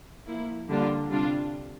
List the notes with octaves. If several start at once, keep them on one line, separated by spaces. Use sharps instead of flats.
F3 A#3 E4
D3 G3 A#3 D4 F4
C3 G3 D4 F4